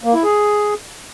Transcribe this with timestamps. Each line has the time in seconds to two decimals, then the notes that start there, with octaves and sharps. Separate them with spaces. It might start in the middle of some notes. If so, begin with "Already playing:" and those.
0.04 A#3
0.14 E4
0.24 G#4